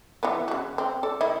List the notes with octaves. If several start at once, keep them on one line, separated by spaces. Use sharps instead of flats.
E3 F3 B3
C#3 F#4
C4
A4 D5
D#3 E4